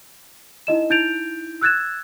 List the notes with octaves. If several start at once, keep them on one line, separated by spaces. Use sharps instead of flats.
D#4 E4 D#5 E7
D#4 E4 G6 A6 D7 F7
E6 F#6 G#6 A6 E7